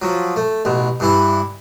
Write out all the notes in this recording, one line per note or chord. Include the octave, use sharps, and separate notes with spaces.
F3 F#3
A3
A1 B2
G2 E3 E4